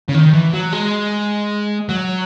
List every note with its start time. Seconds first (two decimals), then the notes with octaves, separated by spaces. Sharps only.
0.09 C#3
0.14 D#3
0.33 E3
0.53 F#3
0.73 G#3
1.89 F#3